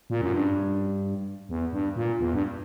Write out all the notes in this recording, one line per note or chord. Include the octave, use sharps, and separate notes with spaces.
A#2
F#2
G2
E2
G2
A#2
E2
G2